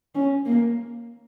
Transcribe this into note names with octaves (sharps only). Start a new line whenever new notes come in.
C#4
A#3